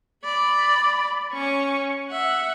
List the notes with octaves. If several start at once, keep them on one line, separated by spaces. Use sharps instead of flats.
D5 B5
C#4 C#6
E5 F#5